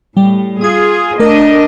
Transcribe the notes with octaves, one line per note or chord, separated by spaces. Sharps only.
A2 G3
F4 G#4 D#6 G#6
A3 D4 A#4 D#5